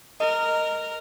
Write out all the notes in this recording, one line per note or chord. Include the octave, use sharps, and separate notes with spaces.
A#4 D#5